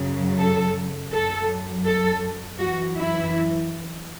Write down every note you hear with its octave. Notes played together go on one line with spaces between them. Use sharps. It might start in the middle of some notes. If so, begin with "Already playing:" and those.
Already playing: F#2 C#3 F#3
A4
F#2 F#3 A4
A4
F#2 E3 F#4
E4